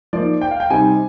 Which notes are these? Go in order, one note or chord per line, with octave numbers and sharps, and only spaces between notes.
F3 A#3 D#4 D5
G5
F5
G5
C3 G3 C4 D#4 G#5